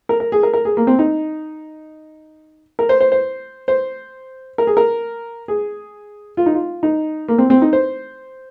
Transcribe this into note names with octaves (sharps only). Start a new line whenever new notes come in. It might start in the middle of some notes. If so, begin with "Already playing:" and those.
A#4
A#4
G#4
A#4
A#4
G#4
A#3
C4
D#4
A#4
C5
C5
C5
C5
A#4
G#4
A#4
G#4
F4
D#4
F4
D#4
A#3
C4
C4
D#4
C5